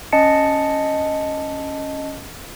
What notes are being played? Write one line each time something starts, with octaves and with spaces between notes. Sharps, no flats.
C#4 D#5 A5 C#7